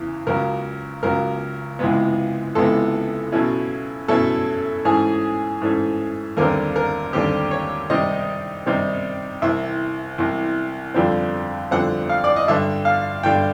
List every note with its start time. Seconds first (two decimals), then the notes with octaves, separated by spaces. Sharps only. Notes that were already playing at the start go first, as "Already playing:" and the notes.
Already playing: E2 C#3 E3
0.27 C#2 C#3 F#3 A#4
1.03 C#2 C#3 F#3 A#4
1.79 C#2 C3 E3 G#3 B3
2.55 C#2 C3 E3 G#3 B3 A4
3.32 B2 F#3 A3 C#4 E4
4.08 B2 F#3 A3 C#4 E4 A4
4.85 G#2 E3 A3 C#4 G#4
5.61 G#2 E3 A3 C#4
6.37 D#2 D3 G3 C4 A#4
6.76 A#4
7.13 D#2 D3 G3 C4 G4
7.51 C#5
7.90 C3 D#3 G3 C4 D#4 D#5
8.66 C3 D#3 G3 C4 D#4
9.42 C2 C3 E3 E5
10.18 C2 C3 E3
10.94 F2 D3 G3 C4
11.71 F2 D3 G3 C4 F#5
12.09 F5
12.24 D5
12.36 D#5
12.48 G2 D3 G3 E5
12.85 F5
13.23 G2 D3 G3 G5